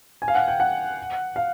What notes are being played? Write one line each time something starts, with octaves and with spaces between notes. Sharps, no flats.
G#5
F5
F#5
G5
F#5
F5